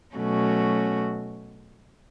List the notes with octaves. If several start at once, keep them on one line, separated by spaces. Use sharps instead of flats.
B2 F#3 A3 C#4 F#4